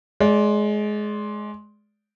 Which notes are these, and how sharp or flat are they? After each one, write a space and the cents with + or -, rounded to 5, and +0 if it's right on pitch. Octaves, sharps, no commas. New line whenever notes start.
G#3 +20 D5 -15